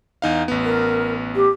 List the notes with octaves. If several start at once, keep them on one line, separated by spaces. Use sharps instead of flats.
E2 D#4 F5
A1 B3
A#4
G4